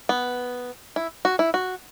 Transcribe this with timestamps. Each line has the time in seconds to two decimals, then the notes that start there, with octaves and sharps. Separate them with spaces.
0.09 B3
0.96 E4
1.25 F#4
1.39 E4
1.54 F#4